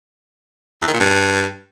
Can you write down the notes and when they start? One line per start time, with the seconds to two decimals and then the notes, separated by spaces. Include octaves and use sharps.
0.81 E2
0.87 D#3
0.93 A#2
0.99 G2